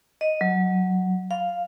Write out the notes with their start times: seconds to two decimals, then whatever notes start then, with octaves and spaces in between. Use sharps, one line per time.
0.21 D#5
0.41 F#3
1.31 F5